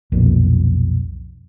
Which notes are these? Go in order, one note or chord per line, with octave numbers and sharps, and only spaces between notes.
B1 F2 A#2